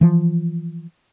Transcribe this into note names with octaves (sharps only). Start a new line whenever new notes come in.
E3 F3